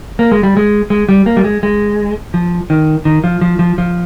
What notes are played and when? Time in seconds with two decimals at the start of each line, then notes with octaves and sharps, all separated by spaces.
0.19 A#3
0.32 G#3
0.43 G3
0.57 G#3
0.90 G#3
1.09 G3
1.26 A#3
1.37 G3
1.44 G#3
1.63 G#3
2.34 F3
2.70 D#3
3.05 D#3
3.24 F3
3.41 F3
3.59 F3
3.78 F3